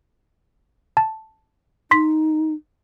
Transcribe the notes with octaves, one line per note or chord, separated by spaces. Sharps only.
A5
D#4 C6 B6